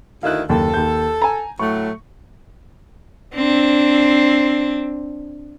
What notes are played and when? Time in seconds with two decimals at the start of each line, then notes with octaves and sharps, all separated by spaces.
0.23 D2 D#3 E4 F5 F#6
0.49 F#1 D#2 A4
0.74 D#2 G6
1.22 G#5 A#5
1.59 A2 F#3 A3 C#6
3.35 C4 D4